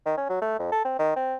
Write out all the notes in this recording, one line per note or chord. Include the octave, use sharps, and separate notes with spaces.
D#3
C#4
F#3
A3
F2
A4
C4
D#3
C4